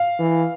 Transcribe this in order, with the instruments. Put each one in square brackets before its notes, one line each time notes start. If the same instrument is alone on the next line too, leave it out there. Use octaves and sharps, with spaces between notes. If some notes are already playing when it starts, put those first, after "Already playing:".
Already playing: [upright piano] F5
[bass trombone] E3